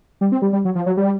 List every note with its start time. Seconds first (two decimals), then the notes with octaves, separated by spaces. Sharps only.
0.21 G3
0.32 C4
0.42 G3
0.53 G3
0.65 F#3
0.75 F3
0.86 F#3
0.97 G3